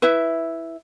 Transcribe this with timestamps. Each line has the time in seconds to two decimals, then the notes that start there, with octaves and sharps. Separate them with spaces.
0.02 E4 B4 E5